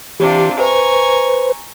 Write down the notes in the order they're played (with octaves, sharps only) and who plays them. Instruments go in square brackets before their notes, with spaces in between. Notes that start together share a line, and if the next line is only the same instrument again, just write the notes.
[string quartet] C3 D4 F4 [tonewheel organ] E3 G4
[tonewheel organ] B4 C5 [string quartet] G#5 A#5 C#6